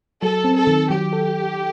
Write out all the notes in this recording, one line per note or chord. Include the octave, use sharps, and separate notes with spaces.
F#3 A4
C4
A4
D#3
F#3 G4
A4